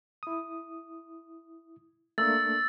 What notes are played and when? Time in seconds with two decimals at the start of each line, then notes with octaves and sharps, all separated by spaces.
0.23 E4 D#6
2.18 A3 A#3 D4 E6 A6